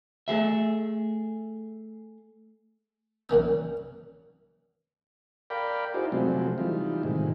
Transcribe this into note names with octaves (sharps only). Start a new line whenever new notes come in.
A3 G#4 E5
F#2 A#2 E3 D#4
A#4 D5 F5 G5 B5
D#4 E4 F#4 G#4 C5 D5
C3 F3 F#3 G#3 A3 C4
E3 G3 D#4 F4
A2 C3 D#3 G#3